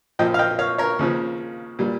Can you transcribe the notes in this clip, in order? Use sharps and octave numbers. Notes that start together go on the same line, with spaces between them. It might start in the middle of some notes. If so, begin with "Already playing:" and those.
A#1 A#2 F3 D#5 G5
F5
D#5 G5
C#5 F5
A#4 C#5
D#2 C#3 F3
A#2 G3